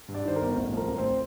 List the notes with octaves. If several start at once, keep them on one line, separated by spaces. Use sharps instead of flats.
G2
D5
D#3 C5
A#4
G1
A1
F3 A#4
A1
C4